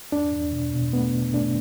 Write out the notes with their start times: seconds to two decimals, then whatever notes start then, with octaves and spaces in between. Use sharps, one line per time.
0.12 E2 D4
0.32 E2
0.52 B2
0.73 B2
0.93 A3 B3
1.13 B2
1.34 A3 D4